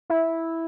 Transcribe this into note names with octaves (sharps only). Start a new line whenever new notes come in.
E4